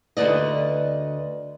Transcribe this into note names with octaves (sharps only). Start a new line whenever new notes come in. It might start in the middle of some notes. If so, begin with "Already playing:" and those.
D2 A#2 B4 D5 D#5